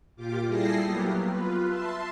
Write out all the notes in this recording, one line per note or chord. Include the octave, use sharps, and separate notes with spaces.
A#2 F4 G4 D6
G3 E4 G#4 A4 A#6 C7
F#3 A#3 B3 G4
F4 B4
E5 A5 C6